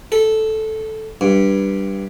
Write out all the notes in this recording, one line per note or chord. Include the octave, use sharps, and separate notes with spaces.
A4
G2